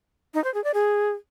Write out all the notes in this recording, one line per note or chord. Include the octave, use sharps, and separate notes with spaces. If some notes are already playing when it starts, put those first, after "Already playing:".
D#4
C5
G#4
D5
G#4